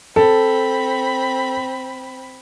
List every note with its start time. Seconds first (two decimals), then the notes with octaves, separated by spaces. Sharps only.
0.16 C4 A4 B5